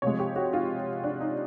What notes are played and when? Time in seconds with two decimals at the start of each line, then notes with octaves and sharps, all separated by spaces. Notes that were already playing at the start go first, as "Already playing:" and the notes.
0.02 C3 F3 G#3 C#5
0.19 G4
0.36 F#4
0.53 F4
1.04 D4
1.20 D#4